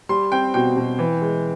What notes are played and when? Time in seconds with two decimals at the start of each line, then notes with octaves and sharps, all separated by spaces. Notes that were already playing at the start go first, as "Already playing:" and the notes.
0.09 G3 C6
0.32 C4 G5
0.54 B2 G5
0.77 B2
0.99 E3
1.21 G#3